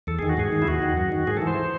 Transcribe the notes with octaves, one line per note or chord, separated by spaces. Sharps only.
E2 A4
D#3 G#4
F#4
G#2 G#4
D#3
E4
D#2 F#4
D#3
F#2
D#3
G#2 G#4
A4
E3
C5